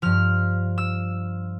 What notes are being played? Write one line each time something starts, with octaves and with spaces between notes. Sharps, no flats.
G2 F3 F6
E6